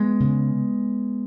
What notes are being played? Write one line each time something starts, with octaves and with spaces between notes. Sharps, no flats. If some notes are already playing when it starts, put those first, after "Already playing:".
Already playing: G#3 B3
C#3